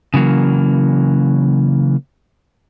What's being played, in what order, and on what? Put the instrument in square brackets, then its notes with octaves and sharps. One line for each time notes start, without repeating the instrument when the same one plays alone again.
[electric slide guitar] C#3 E3 F#3 A#3